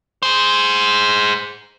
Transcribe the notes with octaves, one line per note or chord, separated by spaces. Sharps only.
G#4 C5